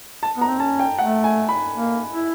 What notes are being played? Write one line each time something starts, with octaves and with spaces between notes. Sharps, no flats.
A5
B3 A#5
C4
C#4 A5
G5
A3 F#5
G#5
B5
A#3
E4